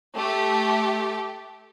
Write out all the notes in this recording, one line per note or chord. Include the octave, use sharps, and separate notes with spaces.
A3 G4